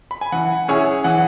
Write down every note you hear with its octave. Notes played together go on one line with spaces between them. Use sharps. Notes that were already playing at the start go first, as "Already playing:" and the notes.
B5
G#5
E3 F#5
C#4 E4 G#4 C#5
E3 F#5